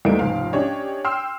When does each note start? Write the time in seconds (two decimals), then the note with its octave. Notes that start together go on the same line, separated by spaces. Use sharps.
0.05 E2 G3 A3 A#3 D#4 D7
0.19 F1 C#2 G#2 F5
0.53 C#4 D4 G4 C#5 D#5
1.04 G5 C6 E6 F6 C7